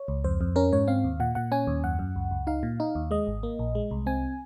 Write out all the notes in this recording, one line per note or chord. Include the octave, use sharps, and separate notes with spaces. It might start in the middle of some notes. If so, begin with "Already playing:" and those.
Already playing: C#5
C#2
F2 C5
F2
C#4 A#4
G#2 C#5
C4 F5
D#2
A#2 F#5
A#2 F#5
C#4 G#5
D#2
F#2 F#5
F#2
C#2
C#2
D#4 F5
A#2
D#4
D#2
G#3 D#5
G#1
A#3
A#1
G#3
C2
C4 G#5